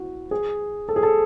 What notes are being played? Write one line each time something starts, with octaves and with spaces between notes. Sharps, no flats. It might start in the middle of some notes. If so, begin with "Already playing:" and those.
Already playing: E4 F#4
G#4
A4
G#4
A4